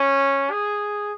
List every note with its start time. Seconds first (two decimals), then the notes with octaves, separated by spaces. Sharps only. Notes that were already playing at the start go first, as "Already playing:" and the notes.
Already playing: C#4
0.51 G#4